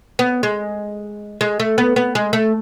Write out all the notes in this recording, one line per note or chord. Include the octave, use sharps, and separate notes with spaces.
B3
G#3
G#3
A3
B3
B3
G#3
A3